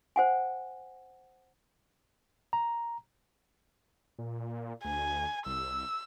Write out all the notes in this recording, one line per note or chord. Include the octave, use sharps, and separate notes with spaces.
C5 F#5 G#5
A#5
A#2
D2 G#5
C2 E6